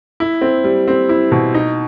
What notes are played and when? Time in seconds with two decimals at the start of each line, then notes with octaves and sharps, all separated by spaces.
0.20 E4
0.41 C4
0.64 G3
0.88 C4
1.09 E4
1.32 B2
1.54 D#4